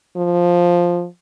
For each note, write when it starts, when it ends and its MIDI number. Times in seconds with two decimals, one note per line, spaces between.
0.17 1.06 53